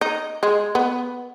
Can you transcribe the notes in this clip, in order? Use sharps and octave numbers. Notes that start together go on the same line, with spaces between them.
D#4
G#3
B3